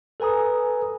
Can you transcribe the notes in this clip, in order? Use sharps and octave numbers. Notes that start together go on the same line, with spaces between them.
A4 B4 G#5 A#5 D#6